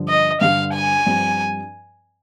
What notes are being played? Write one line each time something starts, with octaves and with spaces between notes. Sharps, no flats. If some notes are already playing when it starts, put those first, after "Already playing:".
Already playing: G2 D3 F3
D#5
G2 D3 G3 F5
G#5
G2 F3 C4